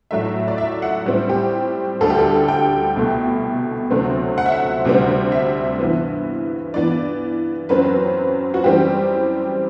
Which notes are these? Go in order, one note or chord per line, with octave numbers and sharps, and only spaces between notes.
A2 F#3 A3 E5
D5
E5
F#5
A2 G3 C4
G4
D2 D3 G3 A4
G4
A4
G5
C2 B2 A3
D2 C3 F#3 A3 C4
F#5
E5
F#5
D2 C3 G3 C4
E5
G2 E3 B3
G2 E3 B3 D5
F#2 F#3 C4 B4
F#4
F#2 E3 G3 C4 G4